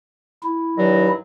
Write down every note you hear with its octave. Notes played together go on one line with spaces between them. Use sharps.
E4
G2 D#3 F#3